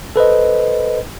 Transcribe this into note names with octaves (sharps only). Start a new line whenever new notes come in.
A4 B4 C5 D#5